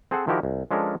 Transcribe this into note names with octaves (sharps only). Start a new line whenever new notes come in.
C4 G#4 A4 C5 F#5
D#3 F3 E4 F#4 G4 A#4
C2
F3 G#3 C#4 D4 A4 A#4